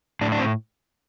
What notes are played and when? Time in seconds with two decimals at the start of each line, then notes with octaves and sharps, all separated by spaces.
0.21 A2 D4
0.32 D4
0.39 C4